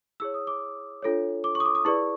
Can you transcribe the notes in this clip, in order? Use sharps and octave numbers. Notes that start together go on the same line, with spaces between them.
E4 G#4 C#5 E6
D#6
D6
D4 F4 A4 C#5
D6
C#6
D#6
D6
D#6
E4 G#4 B4 D5 C#6